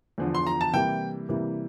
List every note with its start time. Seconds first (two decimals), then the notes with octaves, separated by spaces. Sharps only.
0.18 E2 D3 F3
0.35 C6
0.47 A#5
0.61 A5
0.73 C3 E3 G3 A#3 E4 G5
1.29 C3 E3 G3 A#3 E4